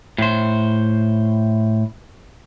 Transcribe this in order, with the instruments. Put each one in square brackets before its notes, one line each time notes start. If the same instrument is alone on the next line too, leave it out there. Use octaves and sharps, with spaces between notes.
[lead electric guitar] A2 C5